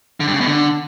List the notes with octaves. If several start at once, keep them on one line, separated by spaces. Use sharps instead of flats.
D3
G2
C#3
B2
D3